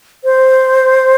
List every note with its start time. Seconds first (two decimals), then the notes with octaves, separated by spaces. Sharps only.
0.24 C5